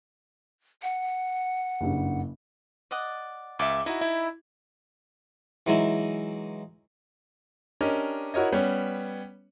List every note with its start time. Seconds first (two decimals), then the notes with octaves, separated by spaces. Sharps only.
0.82 F#5
1.81 F#1 G2 C#3
2.91 D5 D#5 F#5
3.59 C#2 E5 D6
3.86 D#4 E4 F#4
4.01 E4
5.67 E3 F#3 G#3 D#4 E4
7.81 C#4 D4 G4 A#4 D#5
8.34 E4 F#4 A#4 C#5 D#5
8.52 G3 B3 C#4 C#5